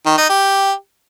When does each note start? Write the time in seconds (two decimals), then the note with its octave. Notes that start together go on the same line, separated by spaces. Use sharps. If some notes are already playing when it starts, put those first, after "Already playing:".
0.06 D#3
0.17 D#4
0.29 G4